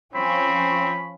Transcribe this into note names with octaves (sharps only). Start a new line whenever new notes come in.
F3 C4 C#4 B5